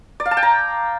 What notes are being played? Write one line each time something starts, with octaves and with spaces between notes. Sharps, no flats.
D5
F5
A5
G5
A#5